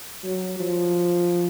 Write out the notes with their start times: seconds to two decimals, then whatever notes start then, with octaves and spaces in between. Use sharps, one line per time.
0.24 F#3
0.60 F3